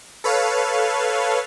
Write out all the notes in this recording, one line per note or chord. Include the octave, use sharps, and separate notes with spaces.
A4 B4 C#5 F5